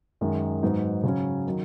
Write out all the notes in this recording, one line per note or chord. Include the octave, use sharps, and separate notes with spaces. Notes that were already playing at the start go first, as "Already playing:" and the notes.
F#2 D#3 G#3
G#2 F#3 B3 D#4
C#3 F#3 C#4
D#3 F#3 D#4